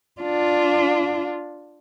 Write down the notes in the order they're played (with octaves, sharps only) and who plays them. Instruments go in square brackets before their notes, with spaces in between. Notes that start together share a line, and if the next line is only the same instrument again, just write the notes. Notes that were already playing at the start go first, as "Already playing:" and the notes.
[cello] D4 F4